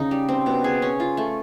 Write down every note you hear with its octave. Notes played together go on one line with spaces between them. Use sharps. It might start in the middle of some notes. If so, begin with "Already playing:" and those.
Already playing: C#3 D#4
G3
C4
B2
G#4
C#4
F4
A3